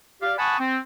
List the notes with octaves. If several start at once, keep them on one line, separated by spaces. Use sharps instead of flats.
G4 D5 F5
F#5 G#5 A5 B5 C#6 D#6
C4